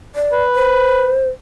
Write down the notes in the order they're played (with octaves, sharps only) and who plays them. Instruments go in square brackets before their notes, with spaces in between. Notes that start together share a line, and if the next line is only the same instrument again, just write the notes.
[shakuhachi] D5
[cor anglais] B4
[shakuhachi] C5